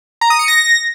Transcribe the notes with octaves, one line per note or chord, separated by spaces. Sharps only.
A#5
D#6
C#7
A#6